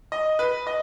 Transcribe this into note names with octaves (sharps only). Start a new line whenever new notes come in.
D#5
B4
D#5